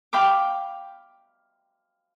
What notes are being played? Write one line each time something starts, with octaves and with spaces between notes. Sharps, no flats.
F5 G5 B5 D6